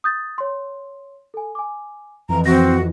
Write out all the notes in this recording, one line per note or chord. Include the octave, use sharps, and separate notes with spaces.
D#6 G6 A6
C#5 C6
A4 G#5
G#5 D6
F2 E3 A#5
C4 F#4 A#6